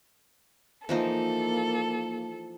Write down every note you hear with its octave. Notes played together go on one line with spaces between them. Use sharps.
E3 F3 A#3 D#4 A4